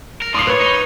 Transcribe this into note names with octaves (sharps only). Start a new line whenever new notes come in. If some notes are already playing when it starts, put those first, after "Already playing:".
A#4
A2 F4 C6 D6 D#6 C7
B4 C#5
D#4